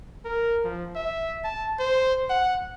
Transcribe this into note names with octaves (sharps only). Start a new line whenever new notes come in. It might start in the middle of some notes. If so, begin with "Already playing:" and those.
A#4
F3
E5
A5
C5
F#5